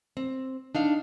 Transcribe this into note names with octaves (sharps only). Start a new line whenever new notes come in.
C4
D4 D#4 F5